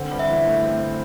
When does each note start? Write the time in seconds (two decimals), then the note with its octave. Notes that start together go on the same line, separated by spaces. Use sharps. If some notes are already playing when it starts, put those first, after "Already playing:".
Already playing: D3 C4
0.11 G2
0.19 E5
0.28 E3
0.46 A3
0.63 C4